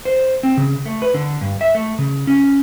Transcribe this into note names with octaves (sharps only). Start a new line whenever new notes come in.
C5
C4
C#3
A3
B4
D3
G2
E5
A3
C#3
C#4